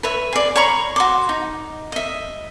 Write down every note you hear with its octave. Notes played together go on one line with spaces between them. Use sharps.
B4 C#5 E5
G#4 D5
C#5 A#5 B5 C#6
F#4 C6 D6
D#4
D#5 E5